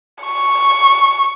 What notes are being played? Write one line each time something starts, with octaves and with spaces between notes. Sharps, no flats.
C#6